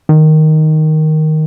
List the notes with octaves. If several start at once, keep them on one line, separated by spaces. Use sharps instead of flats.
D#3